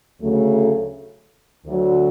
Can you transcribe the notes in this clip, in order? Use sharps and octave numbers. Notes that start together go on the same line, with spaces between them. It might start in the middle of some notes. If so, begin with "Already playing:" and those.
D2 C#3 F#3 A3
D2 D3 F#3